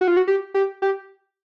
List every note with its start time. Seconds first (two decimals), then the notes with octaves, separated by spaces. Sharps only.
0.01 F#4
0.08 F4
0.17 F#4
0.27 G4
0.54 G4
0.82 G4